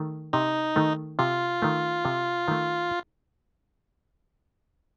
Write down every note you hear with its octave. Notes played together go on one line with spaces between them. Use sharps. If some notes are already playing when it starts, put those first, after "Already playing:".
Already playing: D#3 A3
C3 D#4
D#3 A3
C3 F4
D#3 A3
C3
D#3 A3